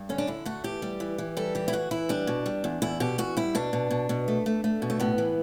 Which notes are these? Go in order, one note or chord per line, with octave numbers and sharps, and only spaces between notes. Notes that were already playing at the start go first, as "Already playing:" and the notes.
Already playing: G2
D3 C#4
D4
D3 E4
A3 F#4
E3 G4
G3
E3
E3
G3 A4
E3 G4
E4
E3 F#4
E3 E4
G3 D4
B2
G3
E2
E2 E4
B2 G4
E2 F#4
G3 E4
B2 D4
B2
B2
B2
A3
A3
A3
B2
A3
A2 B3
E3